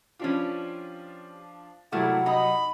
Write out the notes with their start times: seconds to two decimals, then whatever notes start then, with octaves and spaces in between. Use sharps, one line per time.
0.19 F3 C#4 D4 F4 G4
1.92 C3 F#3 G3 A3 A#3 E4 F#5
2.26 D#4 D#5 B5